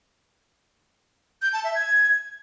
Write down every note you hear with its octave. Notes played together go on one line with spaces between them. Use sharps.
G6
A5
E5
G#6